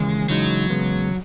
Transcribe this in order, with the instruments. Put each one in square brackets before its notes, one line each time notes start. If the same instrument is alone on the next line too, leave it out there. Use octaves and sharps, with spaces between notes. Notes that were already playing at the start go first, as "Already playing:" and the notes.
Already playing: [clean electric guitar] D#2 C#3 E3 [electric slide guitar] G#3
[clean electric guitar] C#3 E3 G#3 D#4 [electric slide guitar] F#3
[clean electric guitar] E2 C#3 G#3 B3